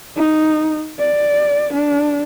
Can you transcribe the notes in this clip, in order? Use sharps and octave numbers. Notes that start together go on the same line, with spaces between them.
D#4
D5
D4